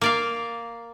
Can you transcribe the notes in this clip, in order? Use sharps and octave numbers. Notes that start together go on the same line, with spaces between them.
A#3 D5 F5